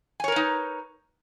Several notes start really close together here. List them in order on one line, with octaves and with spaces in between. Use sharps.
G#5 C#5 A#4 B4 D#4